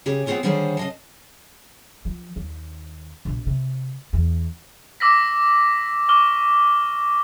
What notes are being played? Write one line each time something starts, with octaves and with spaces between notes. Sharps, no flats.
C#3 G4 G#4
B3 C4 D4 F4 G#4 C#5
D3 D#3 G3 G#4 C5 C#5
C#3 D#5 A5
F3
D#2
A#1 B2
C3
E2
D6 E6 A#6 B6
C#6 D6 F6 G7